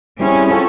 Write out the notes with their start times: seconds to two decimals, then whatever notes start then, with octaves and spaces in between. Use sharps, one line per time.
0.20 G3 C4 C#4 E4 G#4
0.50 C4 F4 A4 C#5